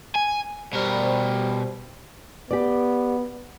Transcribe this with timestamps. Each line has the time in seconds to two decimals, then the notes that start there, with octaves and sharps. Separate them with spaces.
0.16 G#5
0.73 B2 G3 A#4 C5
2.51 B3 G4 D5